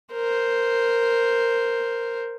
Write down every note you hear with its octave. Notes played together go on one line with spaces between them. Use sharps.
A#4 C5